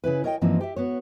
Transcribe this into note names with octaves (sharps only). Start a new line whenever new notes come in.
C#3 C#4 E4 B4
A#4 C#5 D#5 F5 G5
G2 E3 F3 A#3 C4 D#4
G4 E5
B3 F#4 C#5